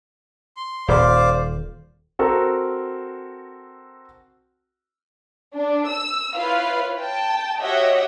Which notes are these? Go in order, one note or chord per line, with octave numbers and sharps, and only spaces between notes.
C6
D#1 C5 D5 F5
C4 F#4 A4 A#4
D4
E6
E4 F4 B4 C#5 F5
G5 A5
F#4 G4 C#5 D#5 E5 F#5